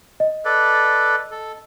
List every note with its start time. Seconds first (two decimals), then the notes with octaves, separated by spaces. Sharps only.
0.20 D#5
0.45 A4 B4 D5
1.31 A4